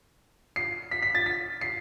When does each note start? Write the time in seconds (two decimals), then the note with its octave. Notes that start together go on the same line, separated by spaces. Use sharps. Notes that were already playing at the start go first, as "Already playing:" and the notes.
0.56 C7
0.91 B6
1.02 B6
1.15 A6
1.26 B6
1.61 C7